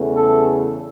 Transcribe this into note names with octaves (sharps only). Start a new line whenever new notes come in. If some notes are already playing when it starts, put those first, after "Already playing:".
Already playing: E2 C#3 E3 A3
A4